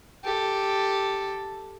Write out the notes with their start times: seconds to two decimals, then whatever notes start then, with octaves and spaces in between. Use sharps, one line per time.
0.24 G4 A4